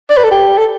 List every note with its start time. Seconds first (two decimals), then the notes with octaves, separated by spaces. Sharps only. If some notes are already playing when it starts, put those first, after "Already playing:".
0.10 D5
0.17 B4
0.24 A4
0.31 G4
0.57 A4